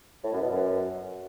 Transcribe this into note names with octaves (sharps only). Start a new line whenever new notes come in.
A2
F#2
B2
F#2